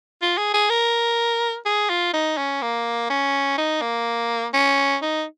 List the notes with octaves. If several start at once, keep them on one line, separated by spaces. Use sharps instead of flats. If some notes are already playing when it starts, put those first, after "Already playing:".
F4
G#4
G#4
A#4
G#4
F4
D#4
C#4
A#3
C#4
D#4
A#3
C#4
D#4